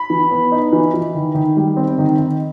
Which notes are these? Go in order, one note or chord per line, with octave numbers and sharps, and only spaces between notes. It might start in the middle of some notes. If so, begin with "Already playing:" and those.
Already playing: B5
E3
B3
D#4
E3
E3
D#3
D#3
G3
C4
D#3
D#3